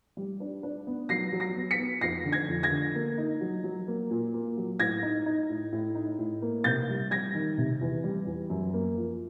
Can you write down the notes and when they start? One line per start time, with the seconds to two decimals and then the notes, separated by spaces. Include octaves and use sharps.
0.17 G3
0.40 D4
0.63 D4
0.87 B3
1.09 F#3 A#6 C7
1.32 F#3
1.40 A#6 C7
1.56 B3
1.71 B6 C#7
1.79 B3
2.01 F2 A#6 C7
2.25 D3
2.32 G#6 A#6
2.48 F2
2.63 G#6 A#6
2.72 D3
2.95 A#3
3.18 D#4
3.41 F#3
3.64 F#3
3.88 A#3
4.11 A#2
4.33 A#3
4.57 F#3
4.79 A2 G#6 A#6
5.03 D#4
5.26 D#4
5.50 A2
5.73 A2
5.95 D#4
6.19 A2
6.42 A#3
6.64 C3 G6 A6
6.89 G3
7.11 G3 G#6 A#6
7.34 D#3
7.58 C3
7.81 E2
8.04 G3
8.26 E2
8.50 F#2
8.74 A#3
8.97 F3